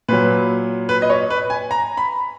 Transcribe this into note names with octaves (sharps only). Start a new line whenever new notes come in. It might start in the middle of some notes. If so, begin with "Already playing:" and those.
A#2 F#3 B4
B4
D#5
C#5
B4
G#5
A#5
B5